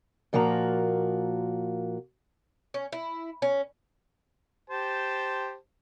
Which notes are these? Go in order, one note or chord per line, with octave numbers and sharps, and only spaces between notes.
A#2 F3 A#3 F#4 A#5
C#4
E4
C#4
G4 C5 A5